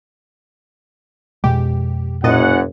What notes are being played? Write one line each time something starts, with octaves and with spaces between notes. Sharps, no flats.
F2 B2 G#3 G4
F#1 F#2 A#2 D#5 F#5 A6